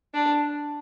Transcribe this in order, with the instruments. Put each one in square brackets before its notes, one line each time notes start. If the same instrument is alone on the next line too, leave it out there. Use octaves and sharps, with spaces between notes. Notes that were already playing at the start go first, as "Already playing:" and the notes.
[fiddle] D4